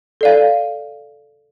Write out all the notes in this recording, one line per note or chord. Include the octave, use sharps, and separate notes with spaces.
A4 D5 F5